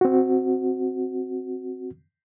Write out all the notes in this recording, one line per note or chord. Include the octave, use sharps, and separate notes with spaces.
C4 F#4